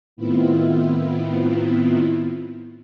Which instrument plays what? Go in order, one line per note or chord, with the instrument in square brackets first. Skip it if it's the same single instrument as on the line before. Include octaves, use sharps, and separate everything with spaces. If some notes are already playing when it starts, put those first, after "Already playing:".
[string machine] A2 D#3 B3 C4 E4 F4